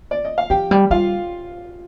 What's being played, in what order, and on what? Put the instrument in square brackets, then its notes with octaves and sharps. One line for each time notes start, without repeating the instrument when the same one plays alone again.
[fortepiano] D5
D#5
F5
[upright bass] F3 [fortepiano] G4 G5
[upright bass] G3
[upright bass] G3 [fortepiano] F4 F5